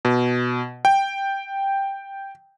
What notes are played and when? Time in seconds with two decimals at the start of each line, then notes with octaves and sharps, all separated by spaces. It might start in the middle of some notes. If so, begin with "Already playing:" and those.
0.05 B2
0.85 G5